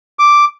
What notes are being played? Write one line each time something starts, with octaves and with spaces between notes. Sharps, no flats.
D6